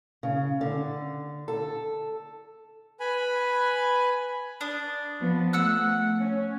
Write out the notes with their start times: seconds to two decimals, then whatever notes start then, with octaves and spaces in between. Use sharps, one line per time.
0.23 C#3
0.61 D3
1.48 A4
3.00 B4 G#5 B5
4.61 D4 D#6
5.20 F3 B3
5.53 A3 F#5 E6 F#6
6.19 C#4